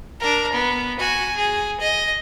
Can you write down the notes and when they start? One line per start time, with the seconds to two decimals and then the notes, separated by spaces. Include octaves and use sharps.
0.20 D4 A#4
0.52 B3
0.99 F#4 G#5
1.35 G#4
1.80 D#5